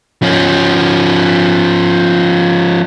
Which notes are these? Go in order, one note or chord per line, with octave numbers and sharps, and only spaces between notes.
F3 C#4